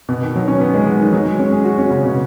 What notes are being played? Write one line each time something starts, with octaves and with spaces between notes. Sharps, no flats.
B2
D#3
F#3
C#4
B3
G#3
F#3
D#3
F#3
G#3
C#4
G#4
F#4
C#4
C#3
B2